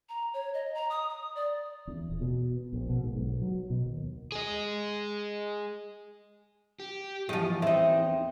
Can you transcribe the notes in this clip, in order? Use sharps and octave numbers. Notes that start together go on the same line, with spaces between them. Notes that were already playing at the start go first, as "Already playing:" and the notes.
A#5
C#5
D#5
A#5
D#6
D#6
D5
E2
D#1
B2
A#1
B2
G#2
B1
F#3
B2
D#2
G#4 D#5
G4
E2 F3 G4 D#5
C4 D#4 E5